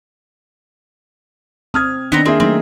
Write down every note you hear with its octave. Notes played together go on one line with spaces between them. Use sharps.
C4 D#6 F6 G#6
D#3 B3 C4 D4 D#4 A#5
A#3 C4 G#4 E5
F#3 A3 C4 D#4